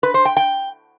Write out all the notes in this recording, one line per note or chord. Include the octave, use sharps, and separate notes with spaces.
B4
C5
G5
G5